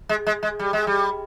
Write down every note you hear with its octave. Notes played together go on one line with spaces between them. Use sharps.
G#3
G#3
G#3
G3
G#3
G3